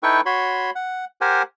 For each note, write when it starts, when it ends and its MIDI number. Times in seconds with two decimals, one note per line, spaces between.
0.03 0.21 63
0.03 0.21 64
0.03 0.21 69
0.03 0.21 71
0.03 0.21 79
0.03 0.21 85
0.26 0.70 66
0.26 0.70 73
0.26 0.70 83
0.26 0.70 84
0.75 1.05 78
1.21 1.42 67
1.21 1.42 70
1.21 1.42 72
1.21 1.42 78
1.21 1.42 80